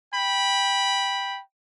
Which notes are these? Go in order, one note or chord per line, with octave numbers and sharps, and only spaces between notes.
G5 B5